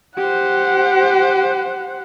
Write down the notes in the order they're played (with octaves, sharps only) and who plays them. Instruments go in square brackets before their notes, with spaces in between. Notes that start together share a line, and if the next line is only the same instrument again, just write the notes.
[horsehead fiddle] G4 C5 [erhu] F#5